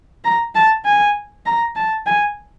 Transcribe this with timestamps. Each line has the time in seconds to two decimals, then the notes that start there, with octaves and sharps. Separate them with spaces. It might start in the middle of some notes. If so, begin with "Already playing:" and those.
0.24 A#5
0.55 A5
0.85 G#5
1.46 A#5
1.76 A5
2.06 G#5